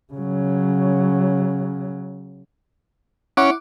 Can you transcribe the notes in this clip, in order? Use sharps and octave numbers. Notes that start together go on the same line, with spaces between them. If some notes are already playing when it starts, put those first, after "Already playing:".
C#3 F#3
C#4 E4 F#5 D6